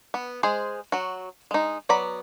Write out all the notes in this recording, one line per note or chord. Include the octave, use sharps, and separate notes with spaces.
B3
G#3 G#4 C5
F#3 F#4
G#3 D#4
F#3 B3 D5 A#5 B5